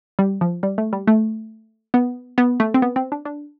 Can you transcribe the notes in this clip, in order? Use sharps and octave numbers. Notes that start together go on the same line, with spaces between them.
G3
F3
G3
A3
G3
A3
B3
B3
A3
C4
B3
C4
D4
D4